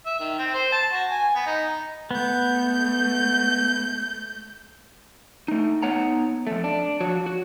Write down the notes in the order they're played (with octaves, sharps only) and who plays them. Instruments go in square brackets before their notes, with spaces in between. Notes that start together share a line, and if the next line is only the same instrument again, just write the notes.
[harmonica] E5
D#3
C4
C5
A5
F#4
G#5
B3
D#4
[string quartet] A3 G6 [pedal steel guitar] B3
[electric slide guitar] A3 D#4
B3 D#4 C#5 F#5 A#5
F2 A3
D4
F3 F#4 C#5
F#4